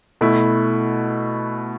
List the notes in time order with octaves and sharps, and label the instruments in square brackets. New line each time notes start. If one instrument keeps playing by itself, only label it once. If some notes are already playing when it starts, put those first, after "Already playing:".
[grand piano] B2 A3 E4